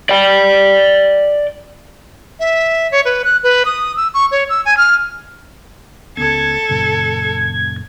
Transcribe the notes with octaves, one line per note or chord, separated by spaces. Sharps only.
D5 G5
E5
C#5
B4
F#6
B4
D#6
E6
C#6
C#5
E6
G#5
F6
C#2 B3 C#4 A4 G#6
F#2 A#2 C#3